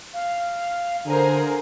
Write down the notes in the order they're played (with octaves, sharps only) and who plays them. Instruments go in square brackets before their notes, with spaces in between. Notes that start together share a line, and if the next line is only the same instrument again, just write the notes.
[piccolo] F5
[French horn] D3 [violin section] G#4 A#4 C5 [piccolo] A#5